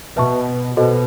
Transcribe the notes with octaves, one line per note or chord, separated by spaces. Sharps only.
B2 B4 E5 A5 C#6
B2 F#4 A4 C5 D#5